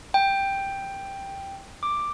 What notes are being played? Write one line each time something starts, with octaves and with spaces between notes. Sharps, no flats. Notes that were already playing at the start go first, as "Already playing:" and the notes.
G5
D6